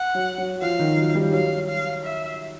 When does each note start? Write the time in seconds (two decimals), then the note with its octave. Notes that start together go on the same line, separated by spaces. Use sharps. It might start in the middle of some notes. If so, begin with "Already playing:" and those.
Already playing: F#5
0.15 F#3
0.38 F#3
0.61 F3 F5
0.79 D#3
0.98 F#3
1.15 G3
1.32 F#3 F5
1.68 F5
2.04 E5